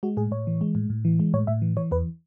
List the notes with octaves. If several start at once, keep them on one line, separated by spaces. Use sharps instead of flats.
G#3 F#4
A2 G#4
A2 C#5
E3
G#3
A2
A2
E3
G#3
A2 C#5
A2 E5
E3
E3 C#5
E2 B4